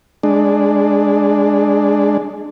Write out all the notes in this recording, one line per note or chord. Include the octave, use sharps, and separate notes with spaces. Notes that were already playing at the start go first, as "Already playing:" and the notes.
G#3 D4